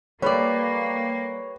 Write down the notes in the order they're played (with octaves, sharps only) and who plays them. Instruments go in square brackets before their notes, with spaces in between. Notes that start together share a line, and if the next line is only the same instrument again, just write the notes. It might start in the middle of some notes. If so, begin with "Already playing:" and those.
[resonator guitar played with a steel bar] G3 A4 D5 [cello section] A#3 [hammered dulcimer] G4 B4 [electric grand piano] C#5